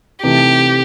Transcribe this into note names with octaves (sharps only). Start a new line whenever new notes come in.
C3 E3 A3 D#4 G4